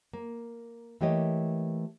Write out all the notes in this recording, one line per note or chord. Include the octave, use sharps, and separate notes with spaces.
A#3
E3 A3 A#3 G4 C#5 D#5